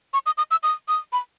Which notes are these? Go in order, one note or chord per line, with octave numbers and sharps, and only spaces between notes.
C#6
D#6
D#6
E6
D#6
D#6
B5